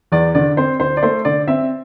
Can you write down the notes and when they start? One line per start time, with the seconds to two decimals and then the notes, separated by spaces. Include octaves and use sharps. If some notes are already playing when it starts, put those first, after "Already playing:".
0.12 E2 D5
0.35 D3 D5
0.57 C4 C5
0.80 D2 C5
0.97 D5
1.03 A3 C5
1.25 D3 D5
1.48 C4 E5